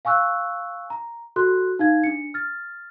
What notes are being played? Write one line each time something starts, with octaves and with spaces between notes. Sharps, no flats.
F5 G#5 C#6 E6 F#6
A#5
F#4 A4 C6 F#6
D#4 F5 G#6
D4 C#7
F6 A6